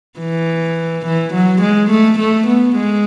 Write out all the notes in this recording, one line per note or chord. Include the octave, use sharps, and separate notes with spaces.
E3
E3
F#3
G#3
A3
A3
B3
G#3